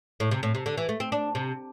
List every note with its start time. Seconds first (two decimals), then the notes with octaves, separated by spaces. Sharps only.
0.20 A2
0.31 C3
0.43 A2
0.55 C3
0.66 D3
0.78 E3
0.89 A3
1.00 C4
1.12 D4
1.35 C3